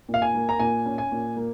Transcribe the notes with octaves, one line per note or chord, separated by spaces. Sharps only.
A#2
F5
G#5
A#3
A#5
A#2 G#5
C#4
G#5
A#2
A#3